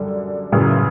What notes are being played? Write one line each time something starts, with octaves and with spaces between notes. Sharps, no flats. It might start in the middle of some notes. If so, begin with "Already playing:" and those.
Already playing: F#2 D3 G3
F#2 C#3 E3